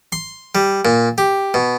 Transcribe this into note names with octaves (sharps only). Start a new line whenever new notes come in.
C6
G3
A#2
G4
B2